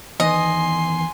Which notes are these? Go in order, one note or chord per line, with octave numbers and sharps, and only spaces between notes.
E2 D#3 B3 D#5 G#5 C6